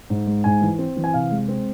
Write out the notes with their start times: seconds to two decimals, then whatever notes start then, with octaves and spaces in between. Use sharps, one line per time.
0.10 G#2
0.27 G#3
0.44 G#2 G#5
0.62 E3
0.79 C4
0.97 E3
1.04 G#5
1.14 C3 F5
1.31 G#3
1.48 C4